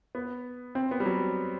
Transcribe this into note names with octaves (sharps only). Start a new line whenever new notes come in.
B3
C4
B3
G3
F#3